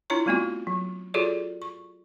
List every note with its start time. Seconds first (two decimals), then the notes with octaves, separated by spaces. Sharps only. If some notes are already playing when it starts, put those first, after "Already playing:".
0.10 D4 E4 F4 C#5 A#5 C#6
0.26 G3 A3 B3 C4 F4 F#4
0.67 F#3
1.14 F4 F#4 G#4 A4 C#5 D5
1.62 C#6